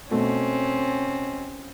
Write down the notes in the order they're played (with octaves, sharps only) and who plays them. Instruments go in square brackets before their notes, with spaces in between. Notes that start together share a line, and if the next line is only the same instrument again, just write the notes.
[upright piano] B2 A3 [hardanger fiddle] C4 C#4